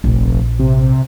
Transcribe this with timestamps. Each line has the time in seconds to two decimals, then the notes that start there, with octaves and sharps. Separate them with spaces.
0.04 F1 A#1
0.59 C3